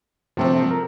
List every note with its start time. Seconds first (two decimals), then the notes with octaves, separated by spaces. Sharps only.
0.37 G1 C3 F3 A3 C4 A4
0.71 A#4